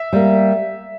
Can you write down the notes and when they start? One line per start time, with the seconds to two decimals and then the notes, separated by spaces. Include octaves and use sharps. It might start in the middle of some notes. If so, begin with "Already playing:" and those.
Already playing: E5
0.13 G3 A#3